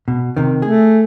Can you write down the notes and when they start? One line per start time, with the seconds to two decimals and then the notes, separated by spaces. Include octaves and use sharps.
0.08 B2
0.37 C3 D#3
0.62 A3 G#4